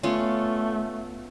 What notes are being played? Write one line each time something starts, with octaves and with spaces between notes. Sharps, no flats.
A3 B3 C#4 F4